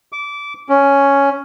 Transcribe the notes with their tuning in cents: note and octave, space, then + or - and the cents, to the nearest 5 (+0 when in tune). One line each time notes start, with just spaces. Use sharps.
D6 -20
C#4 +5